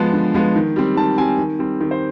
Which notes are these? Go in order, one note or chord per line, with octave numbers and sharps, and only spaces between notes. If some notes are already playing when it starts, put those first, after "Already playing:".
Already playing: F3 G#3 B3 A5
D3
F3 G#3 B3
D#3
G3 C4
D#3 A5
G3 C4 G#5
D#3
G3 C4
D#3
C5